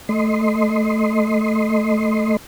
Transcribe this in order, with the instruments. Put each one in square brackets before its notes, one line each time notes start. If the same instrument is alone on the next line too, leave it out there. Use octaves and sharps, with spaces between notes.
[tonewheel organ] A3 D#5 C6